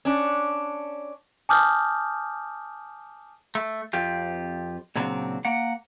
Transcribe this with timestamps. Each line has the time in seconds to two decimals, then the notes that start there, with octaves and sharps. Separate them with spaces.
0.05 C#4 D4
1.49 G#5 A5 D6 D#6 F6 G6
3.55 A3
3.93 F2 C4 F4 G4
4.96 A#2 C#3 F#3 C4 D4
5.45 A#3 F#5